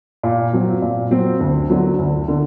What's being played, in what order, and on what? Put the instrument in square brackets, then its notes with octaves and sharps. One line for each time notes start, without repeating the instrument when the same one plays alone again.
[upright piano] A#2
F#3 C4
A#2
F#3 C4
D2
D3 F#3
D2
D3